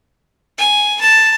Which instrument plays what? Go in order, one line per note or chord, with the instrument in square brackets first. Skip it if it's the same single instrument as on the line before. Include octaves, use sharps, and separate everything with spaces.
[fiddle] G#5
A5